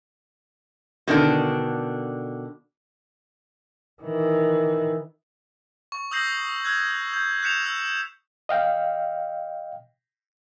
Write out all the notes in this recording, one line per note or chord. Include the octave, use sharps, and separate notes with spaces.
B2 D3 D#3 D4
D#3 E3
C#6
D#6 E6 G6 A#6 C7 F#7
E6 F#6 G#6
G6
F#6 G6 B6 C#7 E7 F7
E6
D#5 F5 G5